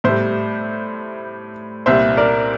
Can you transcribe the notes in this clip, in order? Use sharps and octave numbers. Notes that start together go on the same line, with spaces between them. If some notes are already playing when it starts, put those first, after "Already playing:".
A2 G3 C5 E5
C2 A#2 G3 C5 E5
A#4 D5